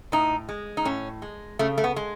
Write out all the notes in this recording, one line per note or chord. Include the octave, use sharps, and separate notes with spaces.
A2 D#4
G#3
D#4
A2 C#4
G#3
C#3 A3
A3
B3
G#3